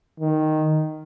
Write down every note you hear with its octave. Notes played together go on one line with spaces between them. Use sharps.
D#3